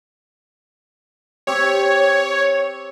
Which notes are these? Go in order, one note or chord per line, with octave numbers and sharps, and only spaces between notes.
C4 G4 C#5